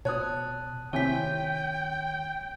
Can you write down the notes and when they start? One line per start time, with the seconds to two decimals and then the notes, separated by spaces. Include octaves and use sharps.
0.05 B2 C#5 A5 D#6 F#6
0.93 C3 D#3 E4 C#5 G5 G#5 B6